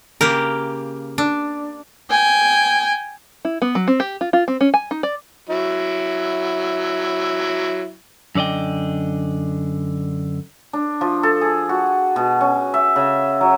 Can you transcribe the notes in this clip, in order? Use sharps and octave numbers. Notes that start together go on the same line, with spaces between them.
C#3 A#3 G4 A#4
D4
G5 G#5
E4
B3
F#3
C4
G4
F4
F4
C4
C#4
G#5
D#4
D5
F#3 E4
F#2 D3 D5 D#5 G5
D4
F3
A4
G#4
F#4
B2
C#4
E5
C#3
F#3